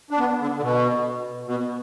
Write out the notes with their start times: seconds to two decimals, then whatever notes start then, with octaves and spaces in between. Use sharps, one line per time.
0.11 D4
0.19 B3
0.40 D3
0.57 D3
0.62 B2
1.47 B2